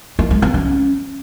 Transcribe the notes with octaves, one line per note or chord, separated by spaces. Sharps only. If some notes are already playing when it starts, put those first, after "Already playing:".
A#3
G#3
C4
C#4